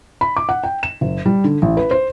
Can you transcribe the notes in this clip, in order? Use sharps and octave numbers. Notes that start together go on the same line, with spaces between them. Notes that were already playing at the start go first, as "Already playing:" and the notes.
B5
D6
F#5
G5
E7
F#1
G3
D3
A1
B4
C5